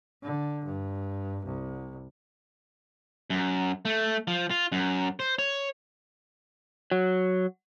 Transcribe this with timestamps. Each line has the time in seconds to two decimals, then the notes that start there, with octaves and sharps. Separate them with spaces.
0.23 D3
0.65 G2
1.46 C2
3.30 F#2
3.85 A3
4.28 F3
4.51 F4
4.72 F#2
5.20 C5
5.39 C#5
6.92 F#3